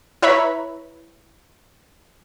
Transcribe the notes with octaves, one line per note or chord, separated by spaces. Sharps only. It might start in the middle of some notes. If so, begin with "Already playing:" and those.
E4 B4 C#5 E5 A#5 B5